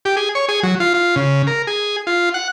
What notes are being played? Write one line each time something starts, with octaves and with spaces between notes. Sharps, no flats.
G4
G#4
C#5
G#4
F#3
F4
F4
C#3
A#4
G#4
F4
F#5